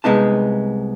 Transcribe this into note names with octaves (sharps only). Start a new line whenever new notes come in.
C2 G#3 B3 D#4 A5